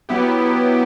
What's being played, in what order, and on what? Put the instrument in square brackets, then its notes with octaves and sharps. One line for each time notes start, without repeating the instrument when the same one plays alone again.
[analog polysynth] F#3 B3 E4 G4